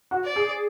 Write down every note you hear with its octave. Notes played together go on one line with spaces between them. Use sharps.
F#4
D5
G#4